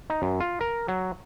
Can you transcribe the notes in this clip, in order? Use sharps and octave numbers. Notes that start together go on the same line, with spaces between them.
D#4
F#2
F4
A#4
F#3